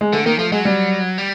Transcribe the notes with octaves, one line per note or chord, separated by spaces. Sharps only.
G#3
D3 A3
D#3 A#3
F3 A3
F#3 G#3
G3
G3